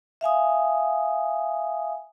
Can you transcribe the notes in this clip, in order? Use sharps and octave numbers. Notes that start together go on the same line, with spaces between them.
E5 F5 G#5 D#6